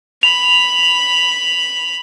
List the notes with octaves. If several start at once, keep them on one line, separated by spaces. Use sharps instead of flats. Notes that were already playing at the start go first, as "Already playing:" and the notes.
B5 F7